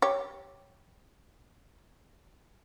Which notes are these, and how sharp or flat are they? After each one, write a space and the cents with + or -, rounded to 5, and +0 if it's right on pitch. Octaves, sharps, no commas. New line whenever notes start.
G4 +0 C#5 +0